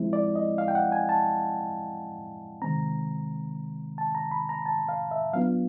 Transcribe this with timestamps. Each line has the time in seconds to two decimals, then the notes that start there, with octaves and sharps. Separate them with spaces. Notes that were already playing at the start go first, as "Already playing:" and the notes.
Already playing: F3 G#3 C4 E4
0.13 D5
0.36 D#5
0.58 F5
0.68 G5
0.75 F#5
0.92 G#5
1.09 A5
2.62 C3 D#3 G#3 C4 A#5
3.98 A5
4.15 A#5
4.31 B5
4.49 A#5
4.66 A5
4.89 F5
5.11 E5
5.33 F#3 B3 D4 F4 F5